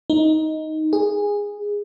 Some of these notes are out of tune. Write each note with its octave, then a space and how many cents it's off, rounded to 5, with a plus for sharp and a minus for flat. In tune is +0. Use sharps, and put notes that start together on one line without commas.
D#4 +10
G#4 -15